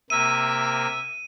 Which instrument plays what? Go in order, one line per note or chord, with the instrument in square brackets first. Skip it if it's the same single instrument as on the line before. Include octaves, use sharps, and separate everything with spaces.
[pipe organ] C3 A#3 [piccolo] E5 [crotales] D#7